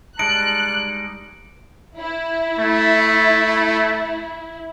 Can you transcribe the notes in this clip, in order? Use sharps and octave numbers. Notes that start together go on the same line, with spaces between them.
G3 G#3 D#4 A5 F#6 D7
E4
A3